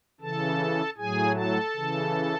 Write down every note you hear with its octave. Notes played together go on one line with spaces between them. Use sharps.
C#3 E3 A4 A5
A2 F#3 G#4 G#5
A4 A5
C#3 E3